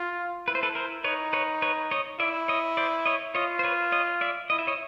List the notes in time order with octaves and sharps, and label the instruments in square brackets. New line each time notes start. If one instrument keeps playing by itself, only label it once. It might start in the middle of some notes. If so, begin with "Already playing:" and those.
Already playing: [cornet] F4
[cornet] E4 [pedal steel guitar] B4
[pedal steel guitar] C5
A4 B4
A#4 C5
[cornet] D#4 [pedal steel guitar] B4 C#5
[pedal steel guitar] B4 C#5
B4 C#5
C#5 D#5
[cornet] E4 [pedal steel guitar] D5 E5
[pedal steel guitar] C#5 D#5
C5 D5
C#5 D#5
[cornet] F4 [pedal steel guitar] C#5 D#5
[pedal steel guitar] C5
B4 C#5
C#5 D#5
D5 E5
[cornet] E4 [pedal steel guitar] D#5
[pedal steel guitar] E5
C#5 D#5